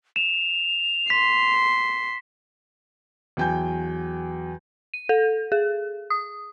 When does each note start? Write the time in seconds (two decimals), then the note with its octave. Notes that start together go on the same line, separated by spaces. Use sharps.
0.16 E7 F7
1.10 C6 B6
3.37 E2 F#3 G5 G#5 G6
4.94 D#7
5.09 A4
5.52 G#4
6.10 D#6